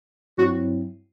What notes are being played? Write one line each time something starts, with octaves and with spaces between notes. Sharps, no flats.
G2 F#3 C4 E4 F#4